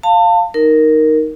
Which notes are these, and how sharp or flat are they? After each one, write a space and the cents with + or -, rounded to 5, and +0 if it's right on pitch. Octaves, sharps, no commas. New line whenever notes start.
F5 +0 A5 +30
D#4 +0 A#4 +0